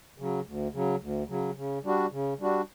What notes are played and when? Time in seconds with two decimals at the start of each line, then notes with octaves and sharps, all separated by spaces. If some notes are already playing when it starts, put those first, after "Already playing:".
0.18 C#3 F#3
0.46 D2
0.73 C#3 F#3
1.01 D2
1.29 C#3 F#3
1.56 C#3
1.84 G3 D4 F#4
2.11 C#3
2.39 G3 D4 F#4